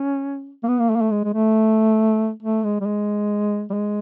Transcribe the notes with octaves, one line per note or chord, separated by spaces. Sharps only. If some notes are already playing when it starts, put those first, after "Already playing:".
Already playing: C#4
A#3
B3
A#3
A3
A#3
A3
G#3
G#3
A3
A3
G#3
G3
G#3
G3
G#3